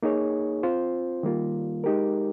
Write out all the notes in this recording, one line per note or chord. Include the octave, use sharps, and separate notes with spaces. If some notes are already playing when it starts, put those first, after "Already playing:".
A#3 D#4 G#4 C#5
C4 F4 C5
D#3 G3 A#3 F4
G#3 D#4 G4 A#4